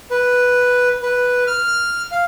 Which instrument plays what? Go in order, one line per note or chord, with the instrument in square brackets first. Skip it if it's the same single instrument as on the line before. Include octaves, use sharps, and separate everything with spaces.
[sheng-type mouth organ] B4
B4
F6
F5